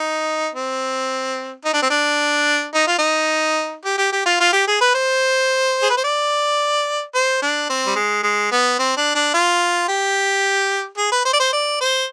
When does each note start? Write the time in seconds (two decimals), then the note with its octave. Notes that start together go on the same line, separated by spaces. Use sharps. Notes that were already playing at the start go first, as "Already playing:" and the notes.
Already playing: D#4
0.55 C4
1.64 D#4
1.73 D4
1.82 C4
1.90 D4
2.74 D#4
2.87 F4
2.98 D#4
3.84 G4
3.98 G4
4.12 G4
4.26 F4
4.40 F4
4.53 G4
4.68 G#4
4.81 B4
4.94 C5
5.83 G#4
5.90 B4
5.97 C5
6.04 D5
7.15 C5
7.42 D4
7.69 C4
7.87 G3
7.96 G#3
8.23 G#3
8.52 B3
8.79 C4
8.97 D4
9.15 D4
9.34 F4
9.88 G4
10.98 G#4
11.12 B4
11.25 C5
11.33 D5
11.40 C5
11.53 D5
11.81 C5